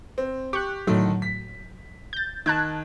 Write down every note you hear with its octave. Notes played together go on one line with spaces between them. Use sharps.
C4
G4 C#6 F#6
A2 D3 D#3 F#3 A3
B6
G6 A6
D#3 A5 F#6 G#6